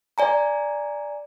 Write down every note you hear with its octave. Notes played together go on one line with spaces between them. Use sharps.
D5 G#5 A#5